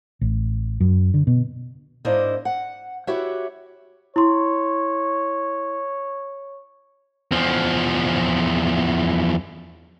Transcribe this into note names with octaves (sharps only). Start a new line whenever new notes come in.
A1
F#2
D3
B2
G#2 A#3 D4 E4 C5 D#5
F#5
E4 F#4 G4 B4 C#5 E5
E4 C#5 C6
E2 F3